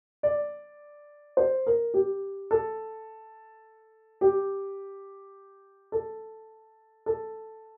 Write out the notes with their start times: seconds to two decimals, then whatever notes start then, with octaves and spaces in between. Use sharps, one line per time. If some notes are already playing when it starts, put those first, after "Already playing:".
0.23 D5
1.37 C5
1.67 A#4
1.94 G4
2.51 A4
4.21 G4
5.92 A4
7.06 A4